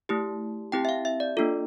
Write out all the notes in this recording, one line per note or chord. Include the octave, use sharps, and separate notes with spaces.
A3 E4 G4
C4 E4 G4 G5
E5
F5
E5
D5
A#3 D4 F4 A4